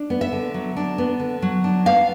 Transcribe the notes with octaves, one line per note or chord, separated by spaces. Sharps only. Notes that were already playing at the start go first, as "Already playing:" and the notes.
Already playing: D4
B3
E5
D3
F#3
D4
B3
D3
F#3
D4
B3 F5